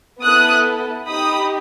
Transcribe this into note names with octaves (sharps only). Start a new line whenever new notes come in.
B3 E4 A4 D#6 F#6
D#4 G4 B5 D#6